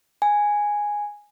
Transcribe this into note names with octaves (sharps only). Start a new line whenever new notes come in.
G#5